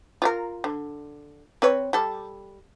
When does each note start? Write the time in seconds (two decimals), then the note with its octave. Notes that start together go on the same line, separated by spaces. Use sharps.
0.22 F4 A4 A#4
0.64 D3
1.62 C4 B4 C#5
1.93 G3 A4